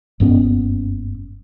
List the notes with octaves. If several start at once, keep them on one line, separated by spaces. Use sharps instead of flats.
F#1 G2 B3 C#4